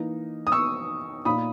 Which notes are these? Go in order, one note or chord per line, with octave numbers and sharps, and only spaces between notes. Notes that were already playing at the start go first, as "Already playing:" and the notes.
Already playing: E3 A#3 D#4
D#6
C#6 E6
A#2 A#3 D#4 B5 D#6